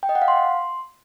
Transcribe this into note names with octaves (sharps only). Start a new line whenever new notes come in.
G5
D#5
F#5
F5
C6